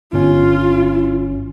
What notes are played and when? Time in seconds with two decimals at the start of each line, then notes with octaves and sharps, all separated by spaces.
0.13 G1 C#4 F4